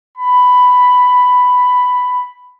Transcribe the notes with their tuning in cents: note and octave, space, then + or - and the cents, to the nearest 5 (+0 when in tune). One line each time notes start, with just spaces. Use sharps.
B5 +10